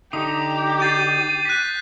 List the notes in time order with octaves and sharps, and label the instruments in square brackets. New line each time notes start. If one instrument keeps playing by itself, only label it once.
[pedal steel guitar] D3 D#4 [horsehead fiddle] G4 [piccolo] A#5 [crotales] D#6
[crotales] G6 A6 C7 [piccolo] D#7
[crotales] F#6 B6